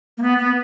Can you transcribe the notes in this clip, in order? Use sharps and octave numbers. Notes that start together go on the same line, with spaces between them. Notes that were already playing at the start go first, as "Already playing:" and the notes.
A#3
B3
B3